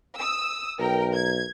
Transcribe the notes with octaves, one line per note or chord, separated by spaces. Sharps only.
D#6 E6
B1 A#4 G5
G#6